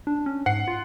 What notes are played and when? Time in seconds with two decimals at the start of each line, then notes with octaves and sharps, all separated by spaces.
0.07 D4
0.26 C#4
0.46 G#2 F#5 C7
0.68 F4